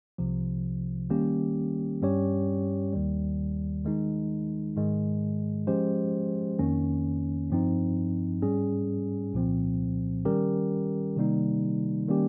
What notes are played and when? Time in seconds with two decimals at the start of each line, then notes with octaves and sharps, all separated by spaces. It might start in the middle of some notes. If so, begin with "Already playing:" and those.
0.18 C2 C3 F3
1.10 D#3 G3 A#3 C#4 G4
2.02 G2 G3 C#4 G4 C#5
2.93 D#2 D#3 G3
3.84 D#3 G#3 D#4
4.76 G#2 D#3 G#3
5.67 F3 G#3 C#4 G4 C5
6.59 F2 D#3 A#3 C#4
7.50 G2 F3 C4 D#4
8.42 G#2 G3 C#4 G#4
9.33 C2 A#2 F3 C4
10.25 D#3 G3 C#4 G4 A#4
11.16 C3 D#3 G3 A#3 D#4
12.08 D#3 G3 A#3 C#4 G4